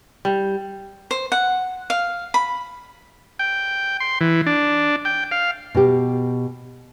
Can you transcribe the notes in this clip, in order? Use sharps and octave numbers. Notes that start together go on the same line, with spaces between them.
G3
C5
F#5
F5
B5
G5
C6
E3
D4
G5
F5
B2 G4